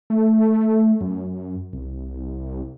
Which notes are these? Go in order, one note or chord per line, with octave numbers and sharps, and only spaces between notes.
A3
F#2
C2